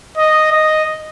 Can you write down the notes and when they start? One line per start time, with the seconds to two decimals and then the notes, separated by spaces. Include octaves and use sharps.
0.17 D#5
0.52 D#5